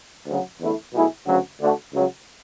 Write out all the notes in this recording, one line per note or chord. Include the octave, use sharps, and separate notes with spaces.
D2 C#3 F#3
E2 D3 A3 E4
B1 B2 A3 E4 G#4
D2 C#3 F#3 C#4 F#4
D2 D3 A3 D4 F#4
C#2 C#3 F#3